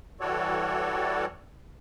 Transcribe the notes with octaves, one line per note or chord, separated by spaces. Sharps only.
E3 G3 F#4 A4 C#5 D5